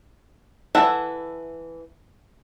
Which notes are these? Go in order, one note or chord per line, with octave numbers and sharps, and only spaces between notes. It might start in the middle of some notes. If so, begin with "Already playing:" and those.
E3 A4 E5 F#5